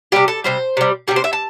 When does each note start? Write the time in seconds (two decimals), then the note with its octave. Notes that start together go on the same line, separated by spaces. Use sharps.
0.12 C3 G3 G4
0.28 A4
0.44 C3 G3 C5
0.77 C3 G3
1.08 C3 G3 G4
1.16 C5
1.24 E5
1.33 A5